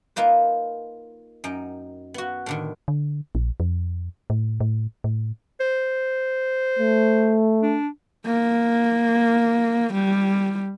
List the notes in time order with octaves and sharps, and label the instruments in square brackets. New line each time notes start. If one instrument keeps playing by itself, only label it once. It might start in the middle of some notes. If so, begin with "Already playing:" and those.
[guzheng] A#3 D#4 F4 B4
F#2 D#4 G5
B3 F#4
A2 D3 D#3
[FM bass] D3
A#1
F2
A2
A2
A2
[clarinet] C5
[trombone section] A3
[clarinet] D4
[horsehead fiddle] A#3
G3